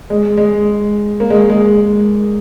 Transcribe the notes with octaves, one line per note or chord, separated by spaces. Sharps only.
G#3
G#3
A#3
G#3
G#3